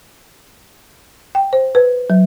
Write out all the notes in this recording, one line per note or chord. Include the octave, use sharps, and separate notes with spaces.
G5
C5
B4
F#3